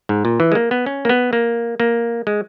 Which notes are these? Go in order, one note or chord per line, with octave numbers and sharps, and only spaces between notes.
G#2
A#2
E3
G#3
A#3
B3
C#4
A#3
B3
A#3
A#3
G#3